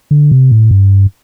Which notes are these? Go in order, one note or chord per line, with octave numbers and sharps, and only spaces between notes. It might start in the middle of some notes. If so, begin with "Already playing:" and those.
D3
C3
A2
G2